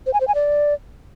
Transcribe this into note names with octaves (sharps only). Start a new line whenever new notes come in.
C5
G#5
C5
G#5
D5